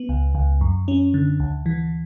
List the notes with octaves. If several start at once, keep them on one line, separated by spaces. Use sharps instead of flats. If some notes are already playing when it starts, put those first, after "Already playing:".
Already playing: B3
C#2
C#2
F#2
C#4
D3
D2
E3